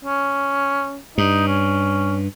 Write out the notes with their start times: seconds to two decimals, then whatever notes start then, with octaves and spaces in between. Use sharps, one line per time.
0.05 C#4
1.18 G2 D#4
1.47 C#4